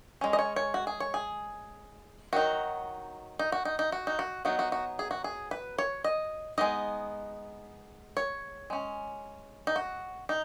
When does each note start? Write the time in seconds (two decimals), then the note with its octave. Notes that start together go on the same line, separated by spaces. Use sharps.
0.21 G#3 C#4
0.33 D#5
0.39 C#5
0.56 C#5
0.74 F#4
0.87 G#4
1.00 C#5
1.14 G#4
2.33 D#3 F#3 D#4 F#4
3.39 D#4
3.52 F#4
3.65 D#4
3.79 D#4
3.92 F#4
4.07 D#4
4.19 F#4
4.45 F#3 B3 D#4 F#4
4.59 F#4
4.72 F#4
4.99 G#4
5.11 F#4
5.24 G#4
5.51 B4
5.78 C#5
6.04 D#5
6.58 G#3 B3 D#4 D#5
8.17 C#5
8.70 G#3 C#4
9.67 D#4
9.76 F#4
10.29 D#4